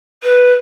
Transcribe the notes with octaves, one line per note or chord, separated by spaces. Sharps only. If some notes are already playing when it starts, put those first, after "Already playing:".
B4